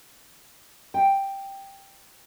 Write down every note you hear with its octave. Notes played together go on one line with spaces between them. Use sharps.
G5